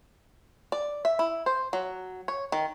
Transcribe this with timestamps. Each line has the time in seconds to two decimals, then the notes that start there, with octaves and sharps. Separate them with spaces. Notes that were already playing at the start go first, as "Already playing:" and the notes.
0.72 D5
1.05 E5
1.19 E4
1.46 C5
1.73 F#3
2.28 C#5
2.52 D#3